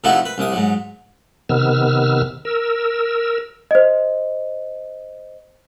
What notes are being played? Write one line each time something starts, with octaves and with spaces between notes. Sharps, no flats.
C3 F3 A3 D#4 E4 F#4
B4
C2 C3 D#6
G#2 F#3
C3 D#3 B3 E6 F6
A#4 E6
C5 D#5